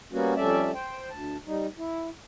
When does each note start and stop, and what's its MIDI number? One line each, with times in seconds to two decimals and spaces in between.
0.12 0.34 55
0.12 0.34 58
0.12 0.34 59
0.12 0.34 61
0.12 0.34 66
0.36 0.71 41
0.36 0.71 55
0.36 0.71 57
0.36 0.71 61
0.36 0.71 74
0.36 0.71 76
0.74 1.09 72
0.74 1.09 79
1.10 1.37 38
1.10 1.37 81
1.47 1.67 55
1.47 1.67 63
1.78 2.09 64